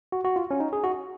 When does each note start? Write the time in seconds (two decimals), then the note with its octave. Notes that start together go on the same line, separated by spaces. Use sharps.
0.12 F#4
0.24 F#4
0.36 F4
0.51 C#4
0.60 D#4
0.73 G#4
0.84 F#4